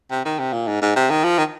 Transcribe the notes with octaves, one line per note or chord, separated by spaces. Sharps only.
C3
D#3
C3
A#2
G#2
G#2
C3
D#3
F3
D#3